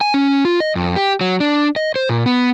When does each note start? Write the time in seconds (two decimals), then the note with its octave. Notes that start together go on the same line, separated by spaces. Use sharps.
0.01 G#5
0.14 C#4
0.45 F4
0.60 D#5
0.76 F2
0.96 G4
1.21 F#3
1.40 D4
1.76 D#5
1.96 C5
2.09 A#2
2.26 B3